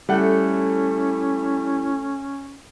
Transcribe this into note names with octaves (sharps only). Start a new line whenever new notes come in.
G3 A3 C#4 E4 F#5